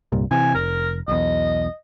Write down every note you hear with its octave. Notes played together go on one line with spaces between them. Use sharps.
C2 G2 A#2
C3 E3 G#5
F1 A#4
B1 E2 D#5